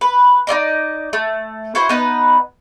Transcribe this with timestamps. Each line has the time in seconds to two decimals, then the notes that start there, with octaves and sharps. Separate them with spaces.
0.01 B4
0.47 D#4 F4 D5 D#5
1.13 A3
1.75 E4 F#4 C5
1.89 B3 D#4 B4